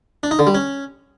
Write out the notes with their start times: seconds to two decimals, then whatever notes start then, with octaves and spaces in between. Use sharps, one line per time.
0.23 D4
0.31 D#4
0.39 D3
0.47 G3
0.55 C#4